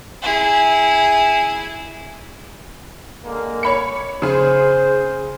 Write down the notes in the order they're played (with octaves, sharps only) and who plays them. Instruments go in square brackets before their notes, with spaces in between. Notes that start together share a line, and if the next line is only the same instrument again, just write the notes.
[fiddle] E4 G#4
[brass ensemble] D3 G#3 A#3
[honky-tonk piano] C#5 B5 C#7
[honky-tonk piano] C#3 G#4 [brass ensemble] C5